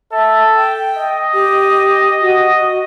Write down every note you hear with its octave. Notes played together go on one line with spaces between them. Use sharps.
A4 E5
G5
D#5
G4
F#4